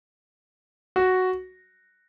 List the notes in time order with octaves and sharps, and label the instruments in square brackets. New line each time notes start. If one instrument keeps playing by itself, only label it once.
[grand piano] F#4